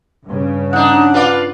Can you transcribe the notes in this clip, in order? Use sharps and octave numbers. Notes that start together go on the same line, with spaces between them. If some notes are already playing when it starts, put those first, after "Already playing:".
G2 C#3
D4 D#4 F#5
F4 B4 D5